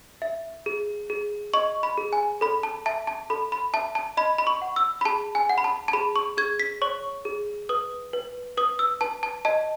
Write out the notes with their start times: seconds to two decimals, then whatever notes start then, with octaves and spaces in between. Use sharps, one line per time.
0.22 E5
0.66 G#4
1.10 G#4
1.54 D#5 C#6
1.83 B5
1.98 G#4
2.13 G#5
2.41 A4 B5
2.63 A5
2.86 E5 A5
3.07 A5
3.30 A4 B5
3.52 B5
3.74 E5 A5
3.95 A5
4.17 D#5 B5
4.38 B5
4.47 C#6
4.62 F#5
4.76 E6
5.01 B5
5.05 G#4 A5
5.35 G#5
5.49 F#5
5.58 B5
5.64 A5
5.88 A5
5.93 G#4 B5
6.16 C#6
6.37 G#4 G#6
6.60 B6
6.82 C#5 C#6
7.25 G#4
7.69 B4 D#6
8.13 B4
8.57 B4 D#6
8.79 E6
9.01 B4 A5
9.23 A5
9.45 D#5 A5